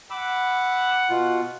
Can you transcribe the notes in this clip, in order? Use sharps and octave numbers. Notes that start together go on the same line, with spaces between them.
F#5 B5 D6 E6
B2 F4